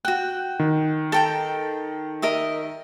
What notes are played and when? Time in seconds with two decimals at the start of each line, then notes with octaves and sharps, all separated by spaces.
0.05 F#4 G5 F#6
0.59 D#3
1.12 A4 G5 A#5
2.22 A#4 D#5 E5